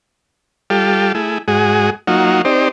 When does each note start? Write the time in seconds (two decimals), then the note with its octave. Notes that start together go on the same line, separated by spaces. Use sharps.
0.70 G3 F4 G4 A4
1.15 A3 E4 G#4
1.48 G#2 G#3 F#4 G#4
2.07 F#3 A#3 D#4 F4 F#4
2.45 C4 D#4 G4 C5 D5